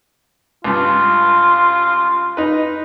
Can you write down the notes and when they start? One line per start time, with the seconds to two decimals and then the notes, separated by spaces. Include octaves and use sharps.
0.64 C#2 G2 F4
2.37 D#4 B4